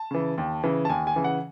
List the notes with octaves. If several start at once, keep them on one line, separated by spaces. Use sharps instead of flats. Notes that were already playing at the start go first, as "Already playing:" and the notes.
Already playing: A5
C#3 E3
D#2
C#3 E3
A5
D#2 G#5
G#5
C#3 E3
F#5